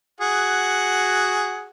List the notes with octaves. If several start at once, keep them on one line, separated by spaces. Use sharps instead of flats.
F#4 G#4 F#5